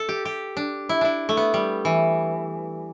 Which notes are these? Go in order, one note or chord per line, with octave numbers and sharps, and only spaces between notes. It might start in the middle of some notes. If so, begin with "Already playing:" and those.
Already playing: A4
G4
G4
D4
E4
D4 E4
A3
B3
G3
E3